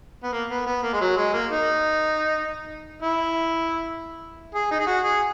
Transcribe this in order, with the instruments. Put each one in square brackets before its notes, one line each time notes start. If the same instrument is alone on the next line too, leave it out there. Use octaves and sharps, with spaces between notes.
[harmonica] B3
A#3
B3
B3
A#3
G#3
F#3
G#3
A#3
D#4
E4
G#4
D#4
G#4
F#4
G#4